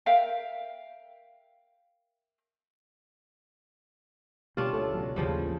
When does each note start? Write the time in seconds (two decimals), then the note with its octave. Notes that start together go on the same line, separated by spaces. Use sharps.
0.06 A#4 E5 F5 G5
4.57 B2 G3 C#4 D4 F4 G4
4.73 D2 A4 C#5
4.94 C#2 B2 F#3
5.16 A1 D#2 C#3 E3 F3 G3